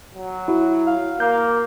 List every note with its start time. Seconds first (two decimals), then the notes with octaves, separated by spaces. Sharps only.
0.15 F#3
0.48 E4 F#4
0.87 F5
1.20 A#3 G6